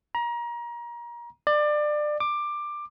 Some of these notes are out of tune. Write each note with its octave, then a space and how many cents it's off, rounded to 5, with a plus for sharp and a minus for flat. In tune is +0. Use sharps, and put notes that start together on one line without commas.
A#5 +30
D5 +25
D6 +15